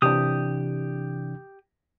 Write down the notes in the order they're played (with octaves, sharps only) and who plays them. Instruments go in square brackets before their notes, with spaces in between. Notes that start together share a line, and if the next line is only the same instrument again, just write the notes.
[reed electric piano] C3 E3 D4 [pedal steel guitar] G4 D#6